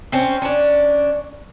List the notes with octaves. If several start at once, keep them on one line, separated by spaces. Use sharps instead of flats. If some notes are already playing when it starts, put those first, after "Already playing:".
C4 C#4
C#4 D4